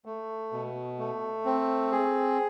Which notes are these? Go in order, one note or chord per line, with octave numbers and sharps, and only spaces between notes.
A3
B2
A3
C4
G#4